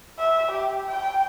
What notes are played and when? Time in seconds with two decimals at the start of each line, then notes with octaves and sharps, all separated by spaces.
0.18 E5
0.51 G4
0.87 G5